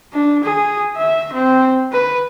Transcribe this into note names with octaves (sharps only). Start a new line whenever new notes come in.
D4
G#4
E5
C4
B4